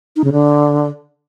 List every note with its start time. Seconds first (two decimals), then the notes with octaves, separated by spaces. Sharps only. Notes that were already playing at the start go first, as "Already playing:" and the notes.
0.16 D#4
0.24 C#3
0.32 D3